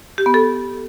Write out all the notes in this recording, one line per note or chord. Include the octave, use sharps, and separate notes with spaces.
G4
B3
A4